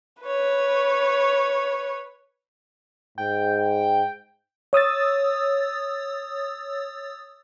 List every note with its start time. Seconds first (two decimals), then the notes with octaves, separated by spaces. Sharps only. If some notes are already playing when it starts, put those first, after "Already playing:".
0.23 B4 C#5
3.18 G#2 G5
4.73 C#5 D#6 E6 A6